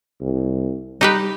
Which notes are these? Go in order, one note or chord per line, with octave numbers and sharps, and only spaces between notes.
C2
G3 D#4 G4 B4